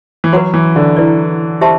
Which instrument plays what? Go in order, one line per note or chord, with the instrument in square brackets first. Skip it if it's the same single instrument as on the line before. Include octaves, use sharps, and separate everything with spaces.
[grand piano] E3
[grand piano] F#3 [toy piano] B4 F#5 C6
[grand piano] E3
D3
[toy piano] E4 B4 D5
G4 C5 E5 A5 C6